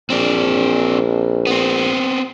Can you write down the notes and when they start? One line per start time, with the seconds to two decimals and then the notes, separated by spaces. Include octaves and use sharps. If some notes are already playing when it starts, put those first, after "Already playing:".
0.10 A#1 C4 D4
1.47 B3 C4